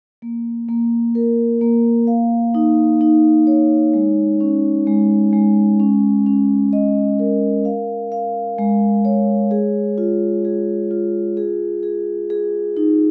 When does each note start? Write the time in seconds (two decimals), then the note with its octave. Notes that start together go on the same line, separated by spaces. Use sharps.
0.22 A#3
0.69 A#3
1.15 A#4
1.61 A#3
2.07 F5
2.54 D#4
3.01 D#4
3.47 C#5
3.94 G#3
4.40 C#4
4.87 G#3
5.33 G#3
5.80 C#4
6.26 C#4
6.73 D#5
7.19 A#4
7.65 F5
8.12 F5
8.58 G#3
9.05 C#5
9.51 G#4
9.98 F4
10.45 G#4
10.91 F4
11.37 G#4
11.83 G#4
12.30 G#4
12.77 D#4